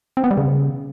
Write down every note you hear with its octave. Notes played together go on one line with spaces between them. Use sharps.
C4
B3
G3
C#3